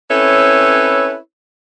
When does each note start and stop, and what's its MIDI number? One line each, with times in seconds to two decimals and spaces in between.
0.11 1.16 60
0.11 1.16 61
0.11 1.16 64
0.11 1.16 69
0.11 1.16 71
0.11 1.16 73